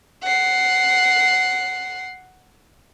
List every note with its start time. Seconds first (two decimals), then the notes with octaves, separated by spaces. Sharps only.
0.23 F#5 C7